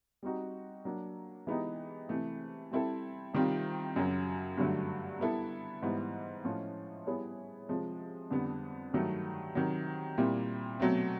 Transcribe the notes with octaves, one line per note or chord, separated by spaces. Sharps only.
G3 C4 D#4 F#4
F#3 A#3 D4
E3 G#3 B3 D#4 G4
C3 E3 A3
G3 C4 E4 A4
C3 D#3 G3 C4 F4
F#2 C#3 F#3
G2 D3 F#3 A3
G3 B3 E4 A4
G#2 E3 G3 B3
A2 F3 A3 C#4 F4
G3 B3 E4 G#4 C#5
C3 F3 G#3
F2 D3 G3 B3
G2 D#3 F#3 A3
C3 D#3 F#3
A#2 G3 C4 E4
B2 F#3 A3 C4